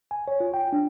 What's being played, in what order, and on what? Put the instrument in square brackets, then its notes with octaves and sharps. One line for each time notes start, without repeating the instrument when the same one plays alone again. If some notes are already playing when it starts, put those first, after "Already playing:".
[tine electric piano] G#5
C#5
F4
G5
D4